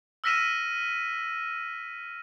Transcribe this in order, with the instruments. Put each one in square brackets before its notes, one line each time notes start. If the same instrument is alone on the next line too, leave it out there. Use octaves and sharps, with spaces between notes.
[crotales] E6 F6 A#6 B6 D#7 E7